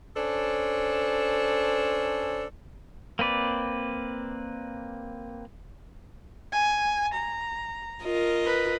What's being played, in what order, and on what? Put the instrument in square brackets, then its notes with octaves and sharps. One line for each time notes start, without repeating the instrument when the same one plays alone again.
[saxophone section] C#4 D4 A4 C5
[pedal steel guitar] A#3 C4 B4 D5
[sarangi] G#5
A#5
[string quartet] F4 A#4 D#5
[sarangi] B4